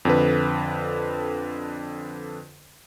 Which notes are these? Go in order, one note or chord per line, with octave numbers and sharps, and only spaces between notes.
F2 D3 B4